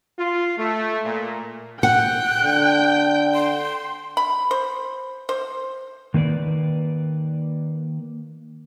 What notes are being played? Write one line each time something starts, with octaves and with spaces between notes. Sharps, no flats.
F4
A3
A#2
F#5 G5 F#6
D3
C6
B5
C5
C5
D#3 A#3 B4 D5